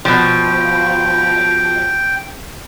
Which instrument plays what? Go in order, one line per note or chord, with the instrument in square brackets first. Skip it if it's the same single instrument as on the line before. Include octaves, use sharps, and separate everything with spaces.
[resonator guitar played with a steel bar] B2 F3 [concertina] G5